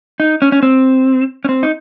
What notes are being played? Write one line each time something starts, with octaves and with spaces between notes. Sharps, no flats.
D#4
C#4
C#4
C4
C#4
C4
D#4